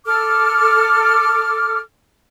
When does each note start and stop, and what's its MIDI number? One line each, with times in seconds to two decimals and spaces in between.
0.06 1.80 69
0.06 1.80 86
0.06 1.80 89